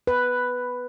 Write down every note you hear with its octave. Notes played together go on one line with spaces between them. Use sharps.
B4